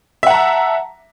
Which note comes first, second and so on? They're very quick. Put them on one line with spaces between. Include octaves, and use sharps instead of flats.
E5 F#5 A#5 A5